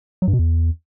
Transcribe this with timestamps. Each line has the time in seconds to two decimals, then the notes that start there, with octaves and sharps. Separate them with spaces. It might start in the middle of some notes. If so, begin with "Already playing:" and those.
0.22 F#3
0.28 G2
0.33 B2
0.39 E2